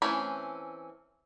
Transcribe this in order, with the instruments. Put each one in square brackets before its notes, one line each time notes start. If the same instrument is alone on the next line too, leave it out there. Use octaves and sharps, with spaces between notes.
[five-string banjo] E3 A3 C4 C#4 B5